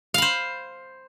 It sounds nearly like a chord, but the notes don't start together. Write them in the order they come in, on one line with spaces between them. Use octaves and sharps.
F5 B5 C5